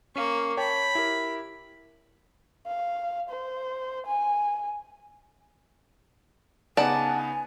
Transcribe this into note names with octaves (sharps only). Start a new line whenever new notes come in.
A#3 C#4 F5 C#6
C#5 G5 A5 B5
E4 G4 A#4
F5
C5
G#5
C#3 B3 D#4 D5 F#5 G#5 A5